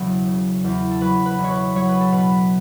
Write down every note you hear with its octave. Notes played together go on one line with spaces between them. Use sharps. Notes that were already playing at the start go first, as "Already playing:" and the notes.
Already playing: E1 C#3 F#3
C#3
E2
A4
F#3 B4
B4
E1
C#5
B4
F#3 C#5
B4
A4
B2 B4